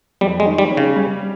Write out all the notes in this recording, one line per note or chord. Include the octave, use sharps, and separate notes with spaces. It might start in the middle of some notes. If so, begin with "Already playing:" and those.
F2 G3
G#3
D#3
G3
C#4
C#3
G3